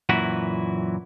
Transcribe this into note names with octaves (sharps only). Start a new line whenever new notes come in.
F#2 A#2 E3 E4 F#4